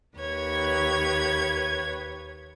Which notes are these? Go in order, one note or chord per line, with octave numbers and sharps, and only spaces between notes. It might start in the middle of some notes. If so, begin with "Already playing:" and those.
D#2 B4 C#5 G#6